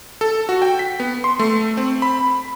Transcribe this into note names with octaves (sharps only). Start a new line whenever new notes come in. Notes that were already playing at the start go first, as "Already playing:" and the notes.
A4
F#4
G5
B6
B3
C6
A3
C4
B5